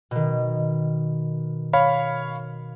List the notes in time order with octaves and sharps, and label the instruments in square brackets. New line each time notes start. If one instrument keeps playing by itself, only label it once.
[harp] B2 D#3
[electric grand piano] C#5 F5 B5